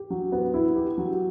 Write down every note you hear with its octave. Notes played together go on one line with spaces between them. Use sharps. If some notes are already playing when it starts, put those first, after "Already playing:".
Already playing: G4
F#3
B3
E4
G4
F#3